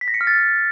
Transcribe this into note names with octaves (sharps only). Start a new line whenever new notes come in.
B6
A#6
C#7
F6
A6